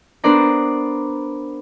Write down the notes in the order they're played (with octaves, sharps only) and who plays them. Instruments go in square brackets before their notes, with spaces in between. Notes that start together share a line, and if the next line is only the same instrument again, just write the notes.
[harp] B3 D4 A#4 C5 D5 A#5